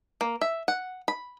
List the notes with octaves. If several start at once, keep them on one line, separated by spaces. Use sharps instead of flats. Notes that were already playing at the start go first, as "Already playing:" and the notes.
A#3
E5
F#5
B5